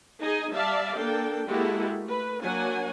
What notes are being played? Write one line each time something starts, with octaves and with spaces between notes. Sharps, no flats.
D#4 G#4 D#5 G#5
G3 D5 E5 F5 A5
A#3 D4 A4 G5
G#3 A#3 E4 F#4 G4 A4
A3 B4
F#3 A#3 D4 F#5 G#5